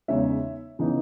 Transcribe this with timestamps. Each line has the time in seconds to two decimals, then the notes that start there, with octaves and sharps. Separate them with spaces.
0.08 E2 C#3 G#3 D#4 C#5 E5
0.79 C#3 E3 B3 D#4